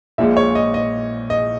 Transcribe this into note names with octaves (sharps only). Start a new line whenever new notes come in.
A#1 A#2 G#3 E5
C#5
D#5
D#5
D#5